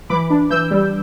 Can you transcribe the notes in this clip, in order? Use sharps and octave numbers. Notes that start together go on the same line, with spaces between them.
E3 B5 D6
D4
E3 E6 G6
G3